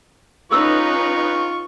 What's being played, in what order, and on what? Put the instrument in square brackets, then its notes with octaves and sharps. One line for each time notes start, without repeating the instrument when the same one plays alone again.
[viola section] C#4 D#4 B4 [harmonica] F4 C#6 [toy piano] A4 E6